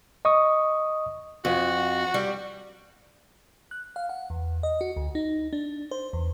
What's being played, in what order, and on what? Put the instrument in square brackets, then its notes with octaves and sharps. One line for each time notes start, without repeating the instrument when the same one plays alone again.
[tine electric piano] D#5 C#6 D#6
[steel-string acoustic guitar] F2 [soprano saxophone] F#4
[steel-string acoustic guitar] G3
[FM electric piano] F#6
F5
F#5
E2
D#5
F#4
D2
D#4
D4
C5
E2